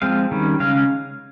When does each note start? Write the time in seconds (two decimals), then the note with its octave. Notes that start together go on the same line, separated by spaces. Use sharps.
0.02 F3 G#3 C4 F5
0.31 D#3 G3 C#4
0.60 C#3 G#3 C#4 F5